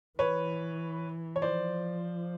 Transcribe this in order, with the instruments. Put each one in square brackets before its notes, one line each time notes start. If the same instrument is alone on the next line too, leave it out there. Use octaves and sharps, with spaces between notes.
[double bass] E3 [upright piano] B4 C#5
[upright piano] C#5
[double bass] F3 [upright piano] C5 D5